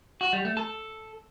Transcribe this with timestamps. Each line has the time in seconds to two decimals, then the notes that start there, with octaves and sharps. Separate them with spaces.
0.21 F#4
0.33 G3
0.45 A3
0.57 A4